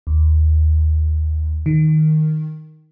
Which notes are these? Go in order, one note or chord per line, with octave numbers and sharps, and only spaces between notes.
D#2
D#3